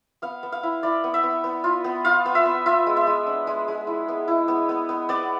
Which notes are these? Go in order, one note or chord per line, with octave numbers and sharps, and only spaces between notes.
B3 F5
B3
F5
E4
E4 D5
B3
E5
B3
B3
F4
B3
F4 F5
B3
E5
B3
F4 E5
G#3
E5
G#3
D4
G#3
G#3
E4
B3
E4
B3
B3
B3
B3 D5